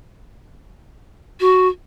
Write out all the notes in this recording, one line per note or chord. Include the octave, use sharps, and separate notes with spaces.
F#4